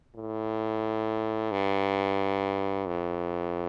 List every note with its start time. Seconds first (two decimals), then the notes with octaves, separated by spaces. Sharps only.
0.15 A2
1.52 G2
2.87 F2